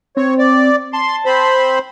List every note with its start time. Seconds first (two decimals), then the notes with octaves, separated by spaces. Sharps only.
0.17 C4 C#5
0.39 D5
0.93 A5 C6
1.26 C4 C5 B5